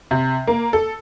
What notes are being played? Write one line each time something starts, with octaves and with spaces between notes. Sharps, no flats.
C3
A#3
A4